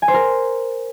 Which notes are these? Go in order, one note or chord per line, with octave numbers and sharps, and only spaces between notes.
G#5
C5
A#4